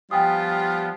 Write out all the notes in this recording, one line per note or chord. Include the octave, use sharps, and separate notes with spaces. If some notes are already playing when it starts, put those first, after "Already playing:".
F3 G3 B3 F4 G5 G#5 D#6